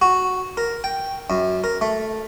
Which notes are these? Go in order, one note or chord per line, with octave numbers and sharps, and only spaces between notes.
F#4
A#4
G5
F#2
A#4
A3